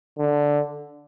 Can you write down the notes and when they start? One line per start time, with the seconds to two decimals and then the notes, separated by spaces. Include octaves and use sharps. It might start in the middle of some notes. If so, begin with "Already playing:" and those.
0.18 D3